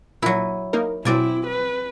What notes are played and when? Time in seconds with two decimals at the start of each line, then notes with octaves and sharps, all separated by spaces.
0.22 A#2 F#3 E4 D#7
0.73 A#3 D#4 A#4
1.05 B2 F#3 C4 E4 D5 G#5
1.47 B4